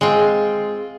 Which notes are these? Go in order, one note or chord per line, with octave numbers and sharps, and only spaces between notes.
G#3 C4 F4